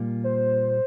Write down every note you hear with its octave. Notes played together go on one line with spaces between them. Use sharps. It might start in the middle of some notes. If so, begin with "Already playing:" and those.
Already playing: A#2 G3 A#3 F4
C5